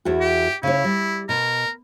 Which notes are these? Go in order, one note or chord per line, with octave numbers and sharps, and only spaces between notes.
E2 E4 F#4
G4
C#3 E4 C#5
G3
B2 A#4